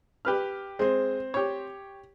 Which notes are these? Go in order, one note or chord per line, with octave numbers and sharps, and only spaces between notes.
G4 B4 F6
G#3 C4 C5
G4 C#5